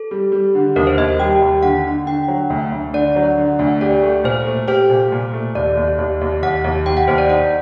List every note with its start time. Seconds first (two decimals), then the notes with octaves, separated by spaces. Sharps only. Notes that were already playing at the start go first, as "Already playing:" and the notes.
Already playing: A4
0.11 G3
0.32 G3
0.55 D3
0.76 D#2 A#4
0.87 C5
0.98 D#2 D#5
1.19 G3 G5
1.42 D#2
1.63 D3 F#5
1.85 D3
2.06 D3 G5
2.28 F#3
2.50 D2
2.72 D2
2.93 D3 D5
3.16 F#3
3.38 D3
3.59 D2
3.81 G4 D5
4.03 A3
4.24 A#2 C5
4.46 A3
4.68 G4 C5
4.89 A#2
5.12 A#2
5.34 A3
5.55 D#2 D5
5.77 D#2
5.98 D#2
6.21 D#2
6.43 D#2 F#5
6.64 D#2
6.86 D#2 G5
6.97 F#5
7.08 D#2 C5
7.18 D5
7.29 D#4 F#5